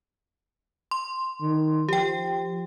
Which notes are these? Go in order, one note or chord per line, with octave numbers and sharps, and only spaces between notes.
C6
D#3
F3 G4 G5